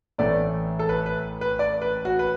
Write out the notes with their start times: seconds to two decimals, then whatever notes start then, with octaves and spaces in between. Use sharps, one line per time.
0.18 A1 A2 E3 A3 D5
0.79 A4
0.89 B4
1.06 B4
1.41 B4
1.59 D5
1.82 B4
2.05 F#4
2.19 B4